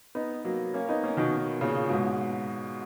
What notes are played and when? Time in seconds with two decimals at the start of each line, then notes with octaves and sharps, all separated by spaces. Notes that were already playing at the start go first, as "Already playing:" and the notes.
0.15 B3 D#4
0.45 F#3 A#3
0.74 A#3 C#4
0.89 B3 D#4
1.03 A#3 C#4
1.17 B2 D#3
1.61 A#2 C#3
1.90 G#2 B2